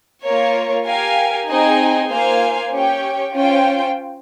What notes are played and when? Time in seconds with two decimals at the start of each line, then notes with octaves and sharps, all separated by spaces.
0.23 A#3 F4 A#4 C#5
0.85 G4 A#4 F5 G#5
1.47 C4 D#4 G#4 D#5 G#5
2.09 A#3 F4 C5 F5 G#5
2.71 C#4 G4 C#5 G5
3.33 C#4 F4 C5 G5